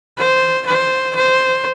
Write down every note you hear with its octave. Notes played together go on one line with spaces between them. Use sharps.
C5
C5
C5